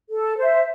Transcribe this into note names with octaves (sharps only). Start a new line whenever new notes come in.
A4
C5 E5